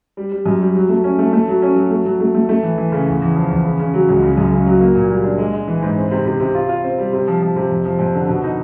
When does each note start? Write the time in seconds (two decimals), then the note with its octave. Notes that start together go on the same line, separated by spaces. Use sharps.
0.17 G3
0.32 G3
0.46 F#2
0.61 G3
0.75 F#3
0.89 A3
1.04 C#4
1.19 A3
1.33 A3
1.48 F#3
1.62 C#4
1.76 F#3
1.91 A3
2.05 F#3
2.20 A3
2.34 A3
2.49 A3
2.63 E3
2.78 E3
2.92 C#3
3.07 E2
3.22 E2
3.35 F3
3.50 E2
3.64 C#3
3.79 C#3
3.94 F#3
4.08 C#2
4.22 C#3
4.37 F#2
4.52 C#3
4.66 F#3
4.80 A#3
4.95 A#2
5.09 G3
5.24 D4
5.38 G#3
5.53 G#3
5.67 E3
5.82 G#2
5.97 C4
6.11 C3
6.26 C3
6.40 C3
6.54 F4
6.69 F4
6.84 C4
6.98 G3
7.13 C3
7.28 F3
7.42 F3
7.56 C3
7.71 F2
7.85 F3
7.99 F2
8.15 D3
8.28 B2
8.43 D#4